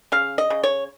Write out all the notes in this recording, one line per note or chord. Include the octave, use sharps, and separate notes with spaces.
C#3 F5
D#5
C#3
C#5